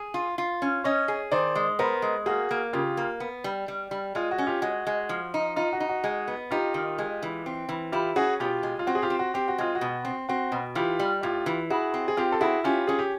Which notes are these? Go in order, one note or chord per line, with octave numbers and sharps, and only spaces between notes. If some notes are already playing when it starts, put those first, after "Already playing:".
Already playing: G#4
F4
F4
C#4
C#4 C#5 D#5
G#4
D#3 C5 D5
G#3
B3 A#4 C5
G#3
A#3 F#4 G#4
A#3
C#3 F4 G4
A#3
B3
G3
G3
G3
G#3 F4
F#4
C#4
F4 G4
G#3 F#4
G#3
F3
D#4
D#4 F4
F#4
D#4
F#4
G#3
B3
D#4 F4 G4
D#3
G#3
E3
C4
E3
E4 F4 G4
C#4 F#4 G#4
B2 F4 G4
G#3
F4
C4 F#4
G#4
F4 G4
C4
F#4
C4 G4
F#4
G#3 F4
F#4
B2
C4
C4 F#4
B2
E3 F4 G4
G3
A2 F4 G4
E3
E4 F#4 G#4
C4
G#4
C4 F4 G4
A4
E4 F#4 G#4
C#4 F4 G4
C#4 G#4
G4